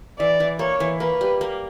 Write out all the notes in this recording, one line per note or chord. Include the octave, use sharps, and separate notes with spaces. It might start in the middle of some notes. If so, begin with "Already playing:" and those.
E3 D5
E3
A#3 C#5
E3
A#3 B4
G3
A#3